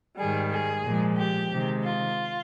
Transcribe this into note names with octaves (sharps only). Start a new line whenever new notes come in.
G#2 D#3 G3 G#4
G#4
A#2 F3 G#3
G4
C3 D#3 G#3
F4